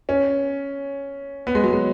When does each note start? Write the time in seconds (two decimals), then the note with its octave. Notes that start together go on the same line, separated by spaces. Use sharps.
0.09 C#4
1.47 B3
1.55 G#3
1.64 F#3
1.73 G#3